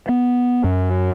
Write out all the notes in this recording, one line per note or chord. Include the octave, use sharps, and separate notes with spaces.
B3
F#2